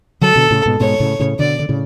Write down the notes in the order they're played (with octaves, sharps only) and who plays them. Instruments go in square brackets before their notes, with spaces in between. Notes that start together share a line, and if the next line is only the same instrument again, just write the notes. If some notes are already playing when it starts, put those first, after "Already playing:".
[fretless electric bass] D3 F#3 [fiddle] A4
[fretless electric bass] B2 D3
A2 C#3
G#2 B2
[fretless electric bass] G#2 B2 [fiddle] C#5
[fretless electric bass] A2 C#3
A2 C#3
[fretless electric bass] B2 D3 [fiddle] D5
[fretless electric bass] D3
A2 C#3